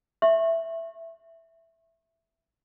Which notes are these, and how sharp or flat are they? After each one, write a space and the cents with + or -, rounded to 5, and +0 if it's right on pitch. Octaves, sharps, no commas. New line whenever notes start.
E5 +0 C#6 -35